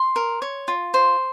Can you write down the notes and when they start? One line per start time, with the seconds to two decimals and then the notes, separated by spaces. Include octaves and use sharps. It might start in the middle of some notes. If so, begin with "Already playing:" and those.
Already playing: C6
0.16 A#4
0.42 C#5
0.68 F4
0.94 C5